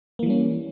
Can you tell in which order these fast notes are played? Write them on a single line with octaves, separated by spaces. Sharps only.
A#3 E3 G3 C#4